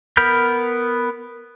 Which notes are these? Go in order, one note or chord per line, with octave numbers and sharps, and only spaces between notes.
B3 A#4 B5 F6 G6